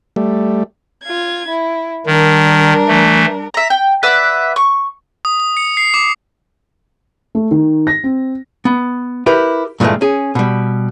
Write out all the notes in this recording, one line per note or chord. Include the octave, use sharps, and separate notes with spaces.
G3 A3
F4 G#6
E4
D#3 G3 D4 A#4
E3 A3
E5 A#5
G5
B4 D5 E5 F#5
C#6
D#6
D#6
C#7
C7
D6
A3
D#3
A#6
C4
B3
E4 G4 A#4 B4
G2 A#2 E3 F#3 G#3 A3
C#4 G#4
B2 G3